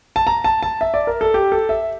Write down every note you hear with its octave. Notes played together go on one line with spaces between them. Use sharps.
A5
A#5
A5
A5
E5
D5
A#4
A4
G4
A4
E5